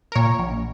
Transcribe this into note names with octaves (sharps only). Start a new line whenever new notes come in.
A#4
A#2 C#5
A#1